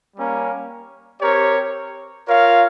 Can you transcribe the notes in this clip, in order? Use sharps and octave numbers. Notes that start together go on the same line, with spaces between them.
G3 A#3 C#4
C4 G4 A#4 C#5
F4 A#4 C#5 F5